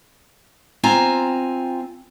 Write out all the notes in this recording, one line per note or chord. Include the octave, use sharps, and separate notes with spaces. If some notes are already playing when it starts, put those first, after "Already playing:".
C4 F4 G#5 A#5